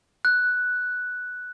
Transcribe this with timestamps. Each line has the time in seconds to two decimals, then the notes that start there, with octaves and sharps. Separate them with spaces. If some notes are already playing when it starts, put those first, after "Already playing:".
0.25 F#6